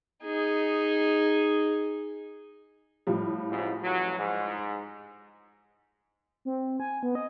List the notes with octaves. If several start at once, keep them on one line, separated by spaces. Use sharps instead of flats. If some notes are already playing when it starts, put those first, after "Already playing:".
D#4 G#4
A2 F3 G3
G#1 G#2 C#3
A1 F#3
G#2
C4
G#5
B3
D#5